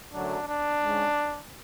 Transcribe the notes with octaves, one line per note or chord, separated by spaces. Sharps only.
F#2 D3 F#3 A3 D4
D4
G#2 G#3 C#4